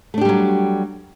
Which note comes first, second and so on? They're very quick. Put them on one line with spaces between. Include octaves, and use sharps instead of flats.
A3 D4 G4 G3 F#3